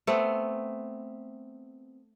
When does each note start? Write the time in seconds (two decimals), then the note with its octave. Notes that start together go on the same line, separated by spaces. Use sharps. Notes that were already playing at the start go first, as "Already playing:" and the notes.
0.07 A3 B3 C4